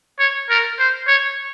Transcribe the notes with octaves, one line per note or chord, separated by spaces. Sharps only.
C#5
A#4
C5
C#5